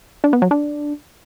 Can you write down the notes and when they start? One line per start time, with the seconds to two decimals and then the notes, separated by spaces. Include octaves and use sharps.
0.24 D4
0.33 B3
0.42 F#3
0.51 D4